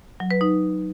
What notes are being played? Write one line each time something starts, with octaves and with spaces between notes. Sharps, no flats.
F#3
B4
D#4